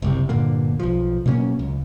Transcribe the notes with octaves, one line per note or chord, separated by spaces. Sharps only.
F#1 C2 C3
G2 A#2 D3 A#3
B1 F3
B2 F#3 A#3 C#4
C#2